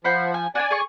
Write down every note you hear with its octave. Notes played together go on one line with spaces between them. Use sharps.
F3 C5 F#5 B5
G#5
D4 F#4 D5 G#5
G#4 C#6